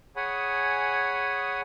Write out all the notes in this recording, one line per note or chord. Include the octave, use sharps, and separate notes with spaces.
G#4 C#5 F#5 G#5 B5 D#6